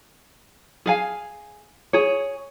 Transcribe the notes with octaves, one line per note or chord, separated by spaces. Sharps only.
G#4 F5 G#5
G#4 C#5